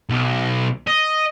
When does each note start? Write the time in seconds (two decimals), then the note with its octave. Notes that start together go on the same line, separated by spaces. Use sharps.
0.10 B1
0.87 D#5